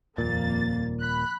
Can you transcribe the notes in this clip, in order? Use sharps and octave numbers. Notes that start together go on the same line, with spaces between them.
D#1 F2 A#2 A#3 A6
B5 F#6